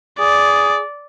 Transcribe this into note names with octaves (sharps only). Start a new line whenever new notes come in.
G#4 D5